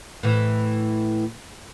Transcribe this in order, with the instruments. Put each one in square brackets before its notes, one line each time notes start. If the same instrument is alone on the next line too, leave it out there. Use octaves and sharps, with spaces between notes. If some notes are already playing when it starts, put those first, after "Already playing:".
[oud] A2 E3